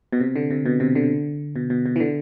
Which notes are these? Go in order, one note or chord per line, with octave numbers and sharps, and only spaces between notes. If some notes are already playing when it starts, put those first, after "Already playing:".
B2
C3
D3
C3
B2
C3
D3
B2
B2
B2
E3
D3